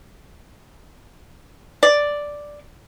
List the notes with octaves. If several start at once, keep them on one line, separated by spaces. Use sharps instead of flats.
D5